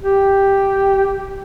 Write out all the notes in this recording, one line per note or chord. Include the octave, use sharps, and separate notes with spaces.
G4